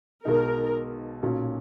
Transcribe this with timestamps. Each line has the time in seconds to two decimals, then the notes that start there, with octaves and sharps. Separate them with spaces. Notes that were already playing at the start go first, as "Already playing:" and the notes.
0.25 B1 B2 G#3 D#4 A#4
1.23 B1 A#2 F#3 C#4